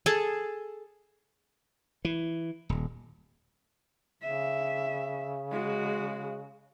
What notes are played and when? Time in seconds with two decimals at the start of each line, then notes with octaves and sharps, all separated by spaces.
0.06 G#4 A4 A5
2.05 E3
2.69 D#1
4.22 C#3 E5
5.51 G#3 F#4